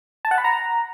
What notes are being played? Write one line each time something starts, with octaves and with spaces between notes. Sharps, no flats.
A5
F#5
B5
A#5